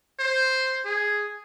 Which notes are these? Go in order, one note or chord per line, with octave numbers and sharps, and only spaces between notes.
C5
G#4